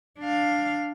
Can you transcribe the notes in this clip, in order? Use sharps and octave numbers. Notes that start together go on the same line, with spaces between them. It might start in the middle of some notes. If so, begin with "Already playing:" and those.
D4 F5